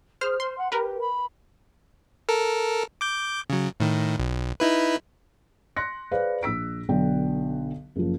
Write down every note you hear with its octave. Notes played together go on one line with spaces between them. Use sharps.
G#4 C5 F6
C5 C6
F#5
G4 A#4 B4
B5
A4 A#4
D6 G6
C#3 F#3
A2 D#3
B1
D#4 E4 B4
C6 F#6 A#6 C#7
G#4 B4 C5 D5 F5
A#1 E6 B6 D7
B1 D3 G5
F#1 F3